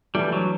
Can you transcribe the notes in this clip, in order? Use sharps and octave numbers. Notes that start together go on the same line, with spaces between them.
E3 G3 A3 D4
F#3